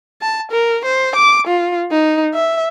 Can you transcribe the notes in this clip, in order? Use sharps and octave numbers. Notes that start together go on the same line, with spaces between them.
A5
A#4
C5
D6
F4
D#4
E5